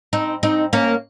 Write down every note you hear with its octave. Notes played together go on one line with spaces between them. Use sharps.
C4 D#4
C4 D#4
A#3 C#4